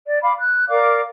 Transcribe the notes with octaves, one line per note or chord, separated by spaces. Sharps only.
D5
F5 B5 D6
F#6
A#4 D5 F5 D6